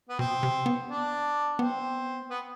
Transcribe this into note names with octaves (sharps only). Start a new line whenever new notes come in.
B3
B2 C4
C3
B3
D4
B3 C4
B3